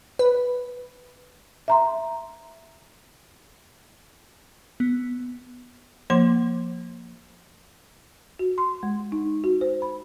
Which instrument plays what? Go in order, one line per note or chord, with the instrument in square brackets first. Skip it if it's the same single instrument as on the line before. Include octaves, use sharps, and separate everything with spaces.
[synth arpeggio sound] B4
[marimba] E5 A#5 C6
[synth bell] B3
[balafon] F3 A#3 C6
[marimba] F#4
C6
G#3
D#4
F#4
C5
B5